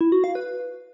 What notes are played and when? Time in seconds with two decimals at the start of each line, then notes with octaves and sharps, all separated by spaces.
0.01 E4
0.12 F#4
0.24 F5
0.35 B4